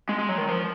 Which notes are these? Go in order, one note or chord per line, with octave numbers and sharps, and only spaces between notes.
G#3
G#3
F#3
D#3
F3